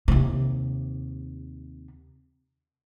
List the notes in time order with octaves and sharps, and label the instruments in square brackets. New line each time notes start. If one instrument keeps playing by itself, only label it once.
[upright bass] D#2 C3